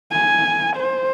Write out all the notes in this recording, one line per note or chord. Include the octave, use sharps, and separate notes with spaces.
G#5
C5